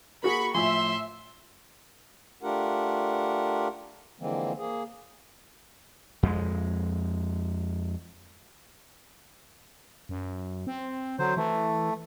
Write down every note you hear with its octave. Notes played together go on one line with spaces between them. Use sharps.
A#3 F#4 G#4 B5 C#6
A2 F3 E5 G#5 C6
A3 D4 F4 G4 A#4 F#5
D3 E3 F3 G#3 A#3 C4
A#3 G#4
F2 G#3
F#2
C4
D3 F#3 C5
E3 A3